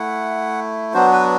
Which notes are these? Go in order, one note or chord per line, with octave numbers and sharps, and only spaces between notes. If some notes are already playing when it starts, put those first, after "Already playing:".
Already playing: A3 E4 F#5
F#3 B3 D4 F#4 C5
B4